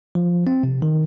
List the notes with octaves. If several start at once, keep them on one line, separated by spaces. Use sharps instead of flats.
F3
C4
C3
D#3